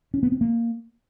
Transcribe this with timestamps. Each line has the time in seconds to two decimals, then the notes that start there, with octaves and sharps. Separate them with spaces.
0.14 C#4
0.23 B3
0.32 C4
0.41 A#3